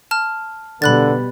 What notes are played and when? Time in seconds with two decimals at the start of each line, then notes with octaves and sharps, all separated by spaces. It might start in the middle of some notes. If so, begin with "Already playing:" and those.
0.11 A5 F6
0.82 B2 D3 G3 B3 B5 F#6 A6